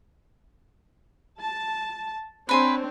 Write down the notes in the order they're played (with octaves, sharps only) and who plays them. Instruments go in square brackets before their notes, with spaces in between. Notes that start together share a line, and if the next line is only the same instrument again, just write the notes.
[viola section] A5
[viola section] C4 D4 C#5 [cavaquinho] B4 G#5 C6